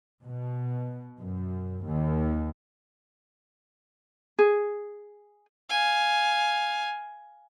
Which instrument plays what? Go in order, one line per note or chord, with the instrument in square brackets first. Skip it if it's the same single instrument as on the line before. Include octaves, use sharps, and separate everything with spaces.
[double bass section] B2
F#2
D#2
[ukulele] G#4
[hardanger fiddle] F5 G#5